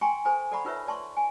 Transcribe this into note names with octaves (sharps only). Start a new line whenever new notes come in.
G5 G#5 A#5 C6 C#6
A4 C5 G#5 A#5
A4 D5 F#5 A#5 B5 C#6
D#4 F4 A#4 B4 C#5 E5
D5 A5 C6 C#6
G#5